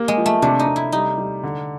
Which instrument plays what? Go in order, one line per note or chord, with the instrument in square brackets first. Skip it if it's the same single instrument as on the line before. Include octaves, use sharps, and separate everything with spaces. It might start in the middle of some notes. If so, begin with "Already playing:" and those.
Already playing: [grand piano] A#3 G4
[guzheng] G#3
[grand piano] F3
[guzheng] A3
[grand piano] C3 [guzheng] D4
[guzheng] D#4
[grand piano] C3
[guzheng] E4
[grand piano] G3 [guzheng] D#4
[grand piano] G3
D3